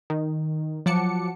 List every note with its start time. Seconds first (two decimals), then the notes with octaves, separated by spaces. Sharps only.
0.10 D#3
0.86 F3 F#3 F#5 A5 D6 C#7